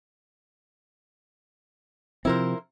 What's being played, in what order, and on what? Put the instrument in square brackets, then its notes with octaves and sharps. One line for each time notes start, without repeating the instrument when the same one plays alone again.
[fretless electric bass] C3 F3 C4 [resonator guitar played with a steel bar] E4 A#4 C5